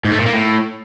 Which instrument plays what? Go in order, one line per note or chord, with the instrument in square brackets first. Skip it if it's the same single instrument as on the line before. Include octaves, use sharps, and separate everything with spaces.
[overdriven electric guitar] G#2
A3
A#2
A#3
A2